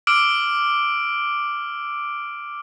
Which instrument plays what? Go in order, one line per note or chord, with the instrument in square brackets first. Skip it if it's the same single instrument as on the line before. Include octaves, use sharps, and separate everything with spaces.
[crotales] D6 E6 F6 D7